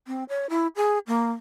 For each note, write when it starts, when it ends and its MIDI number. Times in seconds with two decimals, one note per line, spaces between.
0.07 0.24 60
0.29 0.47 73
0.50 0.67 64
0.76 0.99 68
1.07 1.32 58